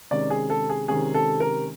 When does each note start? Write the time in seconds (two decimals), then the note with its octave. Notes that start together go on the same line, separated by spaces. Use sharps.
0.11 C3 D#3 G#3 C#4 D5
0.30 G#4
0.50 A4
0.69 G#4
0.88 C3 D#3 G#3 C#4 G#4
1.14 A4
1.40 A#4